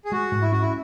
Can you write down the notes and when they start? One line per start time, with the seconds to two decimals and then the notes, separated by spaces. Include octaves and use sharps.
0.05 G#4
0.12 G#3 F#4
0.32 G#2
0.42 E4
0.52 C#4 F#4
0.62 E4